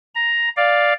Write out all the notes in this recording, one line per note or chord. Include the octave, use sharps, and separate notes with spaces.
A#5
D5 F5